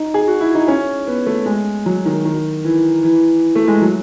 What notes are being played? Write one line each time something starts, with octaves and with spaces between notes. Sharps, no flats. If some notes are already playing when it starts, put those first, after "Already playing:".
Already playing: D#4
G#4
F#4
E4
D#4
C#4
B3
A3
G#3
F#3
D#3
D#3
E3
E3
A3
G#3
F#3